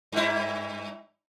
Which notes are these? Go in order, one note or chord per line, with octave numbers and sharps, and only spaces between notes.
G2 E4